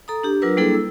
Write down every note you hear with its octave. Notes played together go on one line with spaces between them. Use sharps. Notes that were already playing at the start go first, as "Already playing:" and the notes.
A4 A#5 D#6
D4 G4
F#3 D4 F4 A#4 B4 E6
G3 A#3 D4 E4 G#4 A4
E6